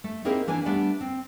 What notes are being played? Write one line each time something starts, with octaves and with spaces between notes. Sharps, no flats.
A3
A#3 C4 D#4 E4 G#4 A#4
E3 A#3 D4 E4 A#4 G#5
G3 A3 B3 D4
C4